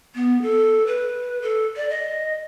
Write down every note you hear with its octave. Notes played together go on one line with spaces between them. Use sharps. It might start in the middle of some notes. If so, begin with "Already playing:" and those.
B3
A4
B4
A4
D5
D#5